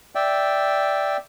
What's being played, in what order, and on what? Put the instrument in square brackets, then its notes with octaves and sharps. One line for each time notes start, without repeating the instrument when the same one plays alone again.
[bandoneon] D5 E5 G5